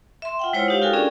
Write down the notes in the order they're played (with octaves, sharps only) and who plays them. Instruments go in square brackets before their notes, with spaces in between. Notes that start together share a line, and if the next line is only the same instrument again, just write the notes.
[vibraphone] E5 C6
F4 F#5 G5
G#3 E4 F4 C5 C#5 F#5
D#4 G4 F5
F4 F#4 A4 A#4 G5 G#5
C#4 D4 G#4 A#4 D5